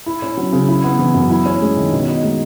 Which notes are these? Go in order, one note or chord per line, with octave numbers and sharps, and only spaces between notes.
E4
C#4
F#3
C#3
E4
B3
E3
F#2
E4
C#4
G#3
D#3
B2
D#4
G#3